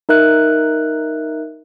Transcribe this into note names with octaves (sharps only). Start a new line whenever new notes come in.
D#4 A#4 E5 F#6